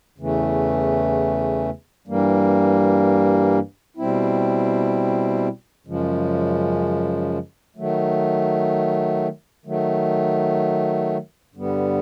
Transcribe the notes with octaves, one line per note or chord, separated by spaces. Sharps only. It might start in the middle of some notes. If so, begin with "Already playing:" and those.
E2 C#3 E3 A3
G2 E3 G3 A#3
B2 G3 C4 E4
F#2 C#3 F3 G#3
D#3 F#3 A3
D#3 F#3 A3
G2 D3 G3 B3